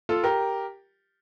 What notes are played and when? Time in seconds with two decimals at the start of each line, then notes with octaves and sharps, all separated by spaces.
0.09 F4 A4
0.24 G4 A#4